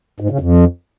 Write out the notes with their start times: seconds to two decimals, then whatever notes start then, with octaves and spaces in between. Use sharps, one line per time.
0.20 G#2
0.30 C#3
0.40 F2